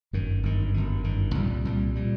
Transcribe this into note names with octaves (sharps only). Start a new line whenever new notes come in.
G1 F#2 D#3
G1 F#2 D#3
G1 F#2 D#3
G1 F#2 D#3
C2 A#2 G3
C2 A#2 G3
A#2 G3